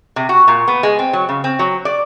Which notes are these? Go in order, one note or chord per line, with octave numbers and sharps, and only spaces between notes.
C3
F#4
A#2
B3
G#3
C4
F#3
C#3
C4
F#3
D5